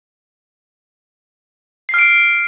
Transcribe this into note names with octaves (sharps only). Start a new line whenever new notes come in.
F6 C7 D7